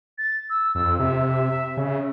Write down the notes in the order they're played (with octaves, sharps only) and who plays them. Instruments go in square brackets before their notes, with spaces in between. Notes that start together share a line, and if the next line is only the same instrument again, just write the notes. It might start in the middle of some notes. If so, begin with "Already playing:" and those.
[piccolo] A6
E6
[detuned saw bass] F2 [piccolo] E6
[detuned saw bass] C3 [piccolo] E5
[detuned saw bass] C#3